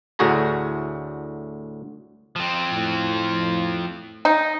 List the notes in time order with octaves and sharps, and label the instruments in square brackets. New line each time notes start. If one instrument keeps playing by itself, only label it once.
[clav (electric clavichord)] D2 A2 D3 F#4 G#4 A#5
[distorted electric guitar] F3 C4
[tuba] A2
[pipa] D#4